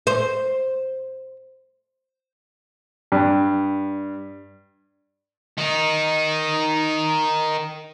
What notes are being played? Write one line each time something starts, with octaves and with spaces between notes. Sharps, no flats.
C5
G2
D#3 D#4